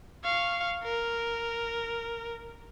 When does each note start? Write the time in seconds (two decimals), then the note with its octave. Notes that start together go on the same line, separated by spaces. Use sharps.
0.24 F5 C#6
0.84 A#4